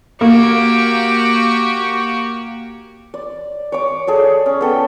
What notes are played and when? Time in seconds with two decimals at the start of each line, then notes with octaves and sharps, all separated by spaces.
0.21 A#3 F#4 G4
3.14 D5
3.72 C#5 D6
4.07 G#4 A4 D5
4.46 C#4
4.61 B3 A4 G5